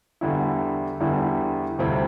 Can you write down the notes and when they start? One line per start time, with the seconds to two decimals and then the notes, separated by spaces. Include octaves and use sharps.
0.21 E2 D3 G3 E4
1.00 E2 D3 G3 E4
1.78 D2 C3 G3 C4 E4